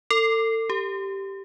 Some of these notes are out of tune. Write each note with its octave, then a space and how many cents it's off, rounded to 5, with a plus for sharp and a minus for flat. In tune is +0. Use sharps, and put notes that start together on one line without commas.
A4 +35
G4 -5